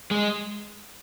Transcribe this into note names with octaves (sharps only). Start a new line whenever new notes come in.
G#3